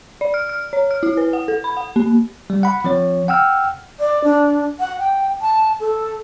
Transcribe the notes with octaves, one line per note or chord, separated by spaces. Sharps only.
D5
F6
F6
C#5
F6
E4
B4
F#5
A4
B5
F#5
A#3
G3
F#5 B5
F3 C4 C#5
F#5 G5 E6 F6
D5
D4
F#5
G5
A5
A4